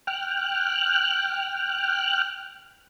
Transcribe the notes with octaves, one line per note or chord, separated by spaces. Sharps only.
G5 F6 F#6